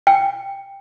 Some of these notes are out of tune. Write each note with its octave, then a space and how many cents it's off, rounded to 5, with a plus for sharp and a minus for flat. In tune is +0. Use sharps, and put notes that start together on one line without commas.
G5 +10